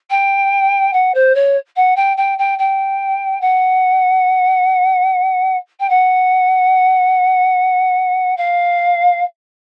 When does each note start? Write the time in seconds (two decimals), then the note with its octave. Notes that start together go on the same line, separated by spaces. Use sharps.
0.10 G5
0.93 F#5
1.14 C5
1.34 C#5
1.76 F#5
1.96 G5
2.17 G5
2.38 G5
2.58 G5
3.41 F#5
5.80 G5
5.89 F#5
8.37 F5